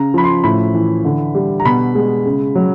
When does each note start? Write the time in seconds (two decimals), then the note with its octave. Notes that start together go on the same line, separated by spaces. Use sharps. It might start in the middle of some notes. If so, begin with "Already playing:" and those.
Already playing: C#3 A#5
0.14 F3 B5
0.24 C6
0.44 A2 B5
0.74 E3
1.05 D3
1.35 G3
1.60 A#5
1.65 B2 B5
1.95 G#3
2.26 C#3
2.55 F#3